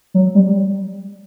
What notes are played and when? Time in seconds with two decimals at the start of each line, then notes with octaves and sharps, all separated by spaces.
0.14 F#3
0.35 G3